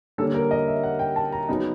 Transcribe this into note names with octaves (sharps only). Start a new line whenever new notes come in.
D3 G3 A#3 C#4 A4
A#4
D#5
E5
F#5
G5
A5
A#5
C#3 F#3 B3 D#4